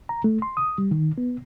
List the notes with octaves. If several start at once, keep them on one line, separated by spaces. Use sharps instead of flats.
A#5
A3
C6
D#6
G3
D#3
B3